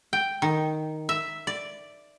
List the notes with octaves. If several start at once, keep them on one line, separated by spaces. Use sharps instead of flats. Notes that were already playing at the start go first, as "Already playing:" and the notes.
G5
D#3
E5
D5